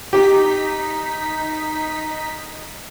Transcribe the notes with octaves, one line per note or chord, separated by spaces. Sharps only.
D#4 G4 B6